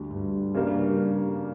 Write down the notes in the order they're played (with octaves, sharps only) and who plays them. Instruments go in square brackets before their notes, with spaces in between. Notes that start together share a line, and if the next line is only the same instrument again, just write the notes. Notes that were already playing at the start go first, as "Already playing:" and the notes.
Already playing: [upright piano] D2 D3 G3 D4
[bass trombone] G2
[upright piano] C#3 G3 A#3 D4